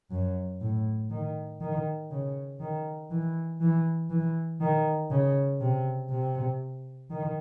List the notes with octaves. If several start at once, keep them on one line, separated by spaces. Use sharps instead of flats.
F#2
A2
D#3
D#3
C#3
D#3
E3
E3
E3
D#3
C#3
C3
C3
D#3